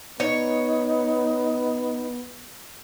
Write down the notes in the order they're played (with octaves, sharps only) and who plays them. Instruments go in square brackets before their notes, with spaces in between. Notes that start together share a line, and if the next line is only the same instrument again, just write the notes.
[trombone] B3 [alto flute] D#4 [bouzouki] C#5